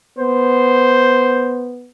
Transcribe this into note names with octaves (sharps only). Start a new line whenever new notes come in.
B3 C5